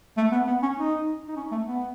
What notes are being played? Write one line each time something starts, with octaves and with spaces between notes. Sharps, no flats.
A3
B3
B3
C#4
D#4
D#4
C#4
A3
B3